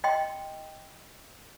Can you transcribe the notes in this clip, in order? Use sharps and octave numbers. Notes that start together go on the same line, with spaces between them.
D#5 G5 C6